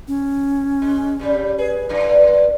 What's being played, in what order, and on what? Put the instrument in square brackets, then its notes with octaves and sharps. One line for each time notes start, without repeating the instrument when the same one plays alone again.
[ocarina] C#4
[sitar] G#3
G2 C#3 G3
[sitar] G#4 [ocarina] B4
[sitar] F#2 A2 D3